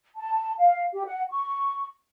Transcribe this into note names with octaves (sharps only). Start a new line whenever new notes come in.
A5
F5
G4
F#5
C#6